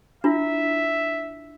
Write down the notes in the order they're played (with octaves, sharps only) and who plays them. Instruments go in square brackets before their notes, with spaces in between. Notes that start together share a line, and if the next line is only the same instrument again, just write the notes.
[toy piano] D4 E4 F4 [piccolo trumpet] E5